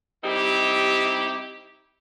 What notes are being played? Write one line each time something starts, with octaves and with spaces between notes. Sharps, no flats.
G3 C4 D#4 E4 G4